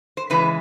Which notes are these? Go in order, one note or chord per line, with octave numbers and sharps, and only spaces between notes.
C5
C#3 E3 G#3 B4